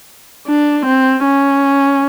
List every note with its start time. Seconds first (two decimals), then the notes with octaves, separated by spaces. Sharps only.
0.47 D4
0.86 C4
1.24 C#4